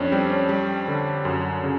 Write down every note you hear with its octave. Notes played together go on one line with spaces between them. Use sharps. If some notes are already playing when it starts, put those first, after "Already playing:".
Already playing: F2 C#4 D4
G3 C4
C#4
G3
D3
F#2
C#3